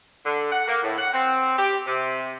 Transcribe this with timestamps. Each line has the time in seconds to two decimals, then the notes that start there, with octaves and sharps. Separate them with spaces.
0.25 D3
0.51 F#5
0.68 A#3
0.82 A2
0.97 F#5
1.13 C4
1.57 G4
1.85 C3